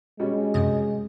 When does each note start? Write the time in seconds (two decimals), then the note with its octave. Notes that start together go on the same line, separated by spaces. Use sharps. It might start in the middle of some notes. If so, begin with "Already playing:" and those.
0.20 B2 G3 G#3 C#4
0.54 F#2 C3 D#5